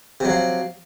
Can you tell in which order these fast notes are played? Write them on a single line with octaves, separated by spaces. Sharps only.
C3 F#3 F3